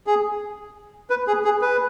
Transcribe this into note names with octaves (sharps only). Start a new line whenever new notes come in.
G#4
B4
G#4
G#4
B4